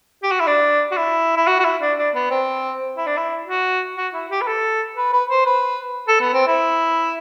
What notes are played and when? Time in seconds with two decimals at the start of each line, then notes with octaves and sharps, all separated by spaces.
0.23 G4
0.32 F#4
0.40 E4
0.47 D4
0.92 F#4
0.97 E4
1.37 E4
1.47 F#4
1.60 F#4
1.65 E4
1.81 D4
1.98 D4
2.15 B3
2.31 C4
2.98 E4
3.07 D4
3.17 E4
3.47 F#4
3.97 F#4
4.14 E4
4.31 G4
4.41 B4
4.48 A4
4.97 B4
5.13 B4
5.31 C5
5.46 B4
6.09 A4
6.21 B3
6.34 C4
6.47 E4